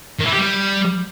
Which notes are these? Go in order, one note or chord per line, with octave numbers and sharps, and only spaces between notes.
D#3
E3
G4
G3